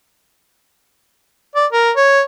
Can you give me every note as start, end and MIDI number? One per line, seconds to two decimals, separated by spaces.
1.55 1.66 74
1.73 1.91 70
1.96 2.21 73